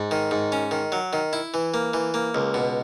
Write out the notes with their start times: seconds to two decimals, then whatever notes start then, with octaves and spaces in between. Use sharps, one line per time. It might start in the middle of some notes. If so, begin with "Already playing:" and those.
Already playing: G#2
0.11 D#3
0.31 G#2
0.52 C#4
0.71 D#3
0.92 F#3
1.13 D#3
1.33 E4
1.54 E3
1.74 A#3
1.94 E3
2.14 A#3
2.35 C#2
2.54 B2